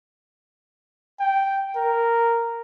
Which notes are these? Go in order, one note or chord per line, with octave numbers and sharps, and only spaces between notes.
G5
A#4